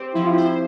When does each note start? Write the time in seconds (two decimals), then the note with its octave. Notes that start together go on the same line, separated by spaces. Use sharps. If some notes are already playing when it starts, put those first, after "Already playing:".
Already playing: C4 G4 C5
0.15 F3 E4
0.24 F4
0.33 E4 C5